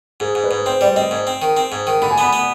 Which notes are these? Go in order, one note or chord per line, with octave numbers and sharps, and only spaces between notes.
G#2 G#4
G#2
B4
G#2
C4 C5
G3 D5
C4 D#5
G#2
C4
D#3
C4
G#2
D#3
D3 B5
G#5
B3 B5
B3